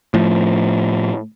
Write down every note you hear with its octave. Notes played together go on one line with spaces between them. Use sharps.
A2 F3